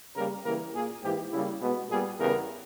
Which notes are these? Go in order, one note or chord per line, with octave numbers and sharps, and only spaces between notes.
C#3 G3 A#3 A#4
C#3 E3 G3 A#3 A#4
A#2 A#3 G#4
G#2 E3 A#3 G4
C#3 G3 A#3 E4
B2 G#3 B3
A#2 G3 B3 G#4
E2 C#3 G3 B3 A#4